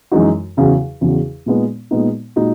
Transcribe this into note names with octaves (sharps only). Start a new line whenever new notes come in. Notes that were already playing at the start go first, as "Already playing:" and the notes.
F#2 E3 G#3 D#4 F#4
E2 C#3 F#3
E2 C#3 F#3
A#2 G#3 B3 D#4
A#2 G#3 B3 D#4
A#2 G#3 D#4 F#4